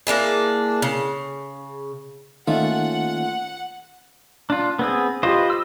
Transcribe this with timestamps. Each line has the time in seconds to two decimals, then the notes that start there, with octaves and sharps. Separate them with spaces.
0.07 A#3 D4 E4 G#4
0.82 C#3
2.48 D#3 A3 A#3 C#4 D#4 F4 F#5
4.50 D4 F4
4.79 B3 C4 G#4
5.23 F4 G4 B4 C5 D#5
5.50 E6